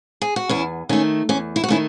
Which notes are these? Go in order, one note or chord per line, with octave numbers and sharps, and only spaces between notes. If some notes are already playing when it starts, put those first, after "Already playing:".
G#4
F#4
E2 C#4 E4
D#3 A3 C#4
E2 C#4
E4
F#4
D#3 A3 C#4 E4